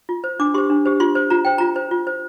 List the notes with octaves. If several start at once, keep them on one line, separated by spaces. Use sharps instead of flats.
F4
C5
D4 D6
G4 C5 C6
D4
G4 C5
F4 C6
C5
F4 A#5
C5 G5
F4 A#5
C5
F4
C5